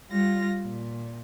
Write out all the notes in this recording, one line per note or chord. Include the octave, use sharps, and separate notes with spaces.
G3 F4 A#6
A#2